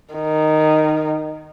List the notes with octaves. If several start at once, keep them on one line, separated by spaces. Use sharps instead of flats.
D#3